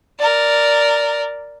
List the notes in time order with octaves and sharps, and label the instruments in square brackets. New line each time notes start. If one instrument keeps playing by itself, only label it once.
[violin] A#4 D5